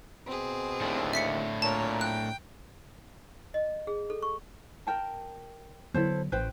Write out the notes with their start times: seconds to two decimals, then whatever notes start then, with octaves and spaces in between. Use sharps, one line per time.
0.26 B2 C4 G#4
0.81 D#2 A2 D4 E4
1.13 E5 B6 C#7
1.62 A#2 A#4 C#5 A5
2.01 G5 F#6
3.54 D#5
3.87 G#4
4.10 A4
4.23 C#6
4.87 A#4 G5 A5
5.94 D3 F#3 B3 E4 A4 C5
6.32 A1 B4 C5 G5